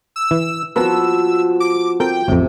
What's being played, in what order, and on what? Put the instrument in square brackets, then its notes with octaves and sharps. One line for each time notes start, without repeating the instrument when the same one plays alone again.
[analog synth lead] E6
[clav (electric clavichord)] E3
[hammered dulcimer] F3 [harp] B3 F#4 [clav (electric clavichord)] C4 A#4 B4 [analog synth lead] E6
[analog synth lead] D6
[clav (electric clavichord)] C4 A4 A#4 [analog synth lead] G5
[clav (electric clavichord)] A1 F2 [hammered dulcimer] C3